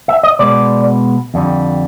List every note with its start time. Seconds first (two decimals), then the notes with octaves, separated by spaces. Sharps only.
0.08 E5
0.23 D#5
0.39 B2 G#3 B3 D5
1.34 F2 D3 G3